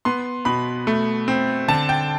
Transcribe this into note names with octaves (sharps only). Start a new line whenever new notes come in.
B3 C6
B2 B5
A3
C4
D3 A5
G5